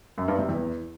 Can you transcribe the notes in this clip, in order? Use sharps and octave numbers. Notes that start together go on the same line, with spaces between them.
F#2
G2
C3
E2